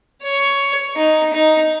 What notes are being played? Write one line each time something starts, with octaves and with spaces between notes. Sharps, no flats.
C#5
D#4
D#4